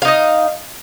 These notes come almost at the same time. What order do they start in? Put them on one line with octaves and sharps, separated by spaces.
F5 D#4 D#5